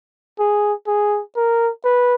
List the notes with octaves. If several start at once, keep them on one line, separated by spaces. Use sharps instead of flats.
G#4
G#4
A#4
B4